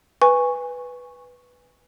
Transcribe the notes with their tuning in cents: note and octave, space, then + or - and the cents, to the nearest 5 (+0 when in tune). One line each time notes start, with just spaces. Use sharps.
B4 +0 G#5 -20 C#6 -5